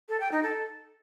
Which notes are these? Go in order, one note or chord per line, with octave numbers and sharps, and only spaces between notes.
A4
G5
D#4
A4